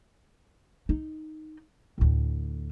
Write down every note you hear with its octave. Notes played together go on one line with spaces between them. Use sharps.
D#4
D2 A2